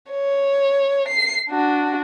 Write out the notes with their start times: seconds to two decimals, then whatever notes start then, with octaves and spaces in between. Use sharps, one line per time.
0.11 C#5
1.08 C7
1.49 D4 F#4